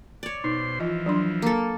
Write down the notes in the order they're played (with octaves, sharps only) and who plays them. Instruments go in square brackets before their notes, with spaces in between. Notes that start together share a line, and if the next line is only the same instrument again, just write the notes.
[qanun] C#5 D5
[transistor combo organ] B2 C5 C6 [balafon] D#4
[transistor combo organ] E3 F3 [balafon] F4 D#5
[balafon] F#3 D4 C6
[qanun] A#3 A4